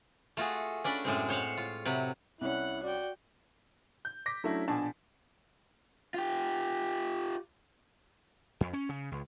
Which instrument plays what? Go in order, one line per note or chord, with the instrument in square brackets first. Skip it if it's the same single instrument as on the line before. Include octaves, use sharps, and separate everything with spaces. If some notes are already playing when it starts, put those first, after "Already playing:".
[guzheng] A3 F4 F#4 G#4
C#4 D4 D5 B5
F#2 A2 G#3 C4
C5 C#5 F5 F#5
F4
C3 F#3 B5
[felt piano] C2 C#4 [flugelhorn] E4 [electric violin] F#5 F#6
[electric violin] F#4 G5 [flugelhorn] D5
[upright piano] G6
D6 A#6 B6
F#3 A3 C#4 D4 E4
A#1 B2 D4 G#5 A5
[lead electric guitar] F4 G4
[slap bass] F2
C#4
C#3
C#2